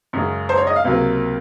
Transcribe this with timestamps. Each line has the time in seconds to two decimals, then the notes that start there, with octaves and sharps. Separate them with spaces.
0.13 F#2 C#3 G#3
0.49 C5
0.58 C#5
0.67 D#5
0.76 F5
0.85 C#2 C3 F#3 A#3